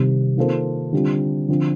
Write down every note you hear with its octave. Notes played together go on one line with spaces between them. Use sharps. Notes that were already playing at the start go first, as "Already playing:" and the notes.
Already playing: C3 D#3 G3
D#3 A#3 F4 A4 C5
D3 G3 C4 F4
D3 F3 C4